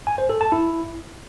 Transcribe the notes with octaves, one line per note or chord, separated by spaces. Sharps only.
G#5
C5
A4
A5
E4